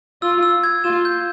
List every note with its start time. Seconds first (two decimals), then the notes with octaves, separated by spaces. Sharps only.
0.22 F4 E6
0.43 E6
0.63 G#6
0.84 F4 E7
1.05 G6